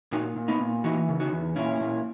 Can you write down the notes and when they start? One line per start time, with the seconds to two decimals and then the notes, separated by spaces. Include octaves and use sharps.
0.12 A#2 D#4 F#4
0.36 A#2
0.48 B3 D#4
0.61 A#2
0.84 E3 D#4 F#4
1.09 C#3
1.20 D#4 F#4
1.32 E2
1.56 A#2 C#4 E4
1.81 A#2